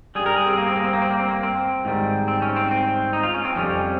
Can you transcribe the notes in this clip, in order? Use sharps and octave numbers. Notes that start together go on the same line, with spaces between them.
G2 G3 G#4
A#4
G#4
C4
A#3
C4
A#3
C4
A#3
C4
A#3
C4
A#3
C4
G#2 D#3 G3
C4
C#4
C4
C4
D#4
F4
C#4
C4
F2 C3 G3 C#4